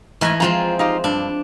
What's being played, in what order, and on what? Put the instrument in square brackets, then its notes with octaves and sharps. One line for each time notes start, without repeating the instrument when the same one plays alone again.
[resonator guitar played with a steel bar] G#2 A3 [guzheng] E3 D#5 G#5
[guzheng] F3 G#3 C4 [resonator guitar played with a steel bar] F4 A#5
[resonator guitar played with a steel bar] D#4 F4 G4
[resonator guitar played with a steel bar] G2 [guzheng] D4